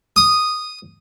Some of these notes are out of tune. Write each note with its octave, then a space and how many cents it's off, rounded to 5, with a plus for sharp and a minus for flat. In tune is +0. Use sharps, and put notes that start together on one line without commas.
D#6 -5